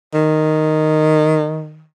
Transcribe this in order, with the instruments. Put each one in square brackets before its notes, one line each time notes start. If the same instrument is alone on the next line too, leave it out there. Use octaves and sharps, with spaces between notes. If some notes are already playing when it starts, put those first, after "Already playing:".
[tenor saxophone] D#3